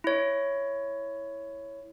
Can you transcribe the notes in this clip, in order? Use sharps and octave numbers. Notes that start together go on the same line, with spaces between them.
E4 C#5